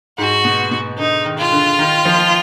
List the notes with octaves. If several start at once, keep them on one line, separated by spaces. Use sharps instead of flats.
G#2 F#4
B2
B2
D3 D#4
D#3
F4
D3
D#3
F3